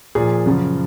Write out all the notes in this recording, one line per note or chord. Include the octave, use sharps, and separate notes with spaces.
A#2 F3 G#4
F#2 C#3 F3